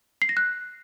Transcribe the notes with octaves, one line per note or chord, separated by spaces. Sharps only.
C7
A#6
F#6